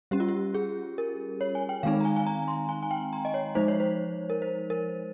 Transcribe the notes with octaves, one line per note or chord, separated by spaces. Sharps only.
G3 C#4 G4
F4
G4
G#4
A#4
C#5
G#5
G5
D#3 G#3 C4 D#4 F5
A#5
G#5
G#5
A#5
C6
G#5
G#5
G5
A#5
D#5
C#5
F3 G#3 D#4 C5
C#5
C5
A#4
C5
A#4